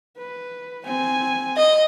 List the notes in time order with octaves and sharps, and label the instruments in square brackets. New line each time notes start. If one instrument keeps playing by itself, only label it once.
[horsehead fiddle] B4
C4 G#5
[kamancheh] D#5